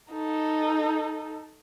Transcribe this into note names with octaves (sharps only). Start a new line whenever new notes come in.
D#4 A4